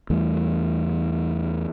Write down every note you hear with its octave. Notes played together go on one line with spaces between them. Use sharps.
E2 E3 G3 A3